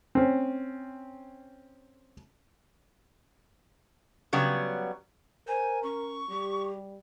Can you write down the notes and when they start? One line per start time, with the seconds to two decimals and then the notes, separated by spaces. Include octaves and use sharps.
0.15 C4 C#4
4.33 C#3 F#3 G3 B3
5.47 A#4 C5 G#5
5.83 C#4 C#6
6.29 G3 G4